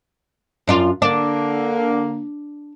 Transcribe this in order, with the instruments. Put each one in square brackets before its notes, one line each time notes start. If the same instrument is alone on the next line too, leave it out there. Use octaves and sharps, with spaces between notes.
[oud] F#2 D4 F4
[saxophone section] D3 A#3 [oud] D4